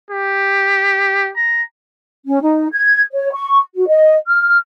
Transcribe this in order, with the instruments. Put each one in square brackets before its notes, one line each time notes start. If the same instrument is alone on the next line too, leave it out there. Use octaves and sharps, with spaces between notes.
[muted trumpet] G4
A#5
[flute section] C#4
D#4
G#6
C#5
C#6
F#4
D#5
F6